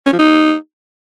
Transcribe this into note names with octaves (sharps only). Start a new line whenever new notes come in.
C#4
F3
D#4